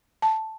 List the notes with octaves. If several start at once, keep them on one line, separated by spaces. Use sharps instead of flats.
A5